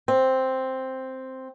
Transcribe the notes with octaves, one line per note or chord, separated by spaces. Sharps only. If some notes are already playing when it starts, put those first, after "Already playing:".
C4